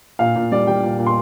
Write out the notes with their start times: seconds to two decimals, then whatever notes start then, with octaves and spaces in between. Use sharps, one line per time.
0.19 A#2 F5
0.36 A#2
0.52 G3 D5
0.67 G3 G5
0.83 A#2
0.99 A#2
1.06 C6